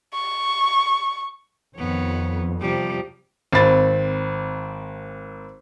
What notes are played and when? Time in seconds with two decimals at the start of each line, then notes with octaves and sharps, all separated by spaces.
0.14 C#6
1.76 F2 D#3 B3 C#5
2.61 C3 F3 G3
3.53 G#1 C4 B5 A6